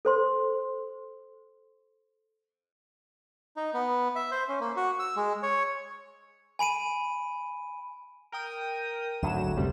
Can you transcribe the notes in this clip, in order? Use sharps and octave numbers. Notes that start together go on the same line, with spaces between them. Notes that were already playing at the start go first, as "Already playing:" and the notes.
A4 C5 C6
D#4
B3
E5
C5
C#4
A#3
F#4
E6
G#3
C#5
G#5 B5 D7 D#7
A#4 G5 D#6
G#1 D2 F#3 E7
F#2 C3 G3